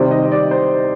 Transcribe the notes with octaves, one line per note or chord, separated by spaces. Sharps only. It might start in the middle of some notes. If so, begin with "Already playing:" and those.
Already playing: C3 D#3 G3 C4 D5
D#5
D5
C5